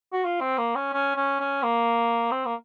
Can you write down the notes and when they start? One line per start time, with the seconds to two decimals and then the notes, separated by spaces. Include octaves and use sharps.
0.12 F#4
0.24 F4
0.41 C4
0.58 A#3
0.75 C#4
0.93 C#4
1.16 C#4
1.40 C#4
1.63 A#3
2.31 C4
2.45 A#3